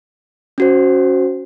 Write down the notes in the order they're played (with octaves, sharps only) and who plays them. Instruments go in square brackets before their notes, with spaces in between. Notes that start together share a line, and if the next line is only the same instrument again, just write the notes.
[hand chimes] C#4 F#4 C5